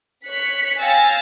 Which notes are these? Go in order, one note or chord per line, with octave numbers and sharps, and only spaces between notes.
C#5 F#6 B6 C#7
F5 G5 G#5 E6 A6 A#6